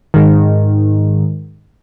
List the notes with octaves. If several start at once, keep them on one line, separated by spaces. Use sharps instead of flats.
G#2 D#3